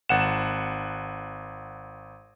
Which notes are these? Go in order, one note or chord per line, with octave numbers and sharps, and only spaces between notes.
G#1 F#5 E7